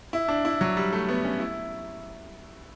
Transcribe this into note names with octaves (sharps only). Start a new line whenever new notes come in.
E4
D4
E4
F#3
G3
A3
B3
C#4
E4